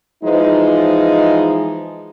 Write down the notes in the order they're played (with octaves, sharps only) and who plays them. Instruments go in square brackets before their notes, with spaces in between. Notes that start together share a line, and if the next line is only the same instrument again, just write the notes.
[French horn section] E3 F3 G#3 D#4